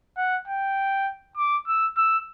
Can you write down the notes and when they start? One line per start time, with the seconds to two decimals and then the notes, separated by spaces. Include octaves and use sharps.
0.17 F#5
0.48 G5
1.37 D6
1.68 E6
1.97 E6